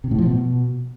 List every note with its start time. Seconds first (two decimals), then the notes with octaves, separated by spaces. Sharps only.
0.04 C3
0.11 A2
0.18 F3
0.26 B2